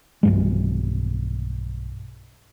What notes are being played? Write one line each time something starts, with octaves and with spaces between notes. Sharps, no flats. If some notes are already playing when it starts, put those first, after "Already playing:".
B1 G2 G#3